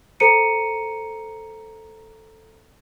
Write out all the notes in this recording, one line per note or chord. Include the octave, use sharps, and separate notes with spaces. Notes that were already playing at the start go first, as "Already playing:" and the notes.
A4 C5 A#5 C#7 D#7